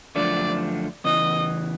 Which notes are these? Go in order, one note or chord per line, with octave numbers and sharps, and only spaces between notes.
F#2 D3 F3 A3 D4 D5
E2 C#3 E3 D#5